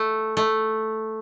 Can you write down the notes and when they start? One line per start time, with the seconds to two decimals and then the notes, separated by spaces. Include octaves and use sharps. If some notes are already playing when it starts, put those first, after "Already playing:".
Already playing: A3
0.37 A3